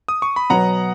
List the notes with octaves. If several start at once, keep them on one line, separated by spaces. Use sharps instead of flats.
D#6
C#6
B5
B2 F#3 B3 F#5 A#5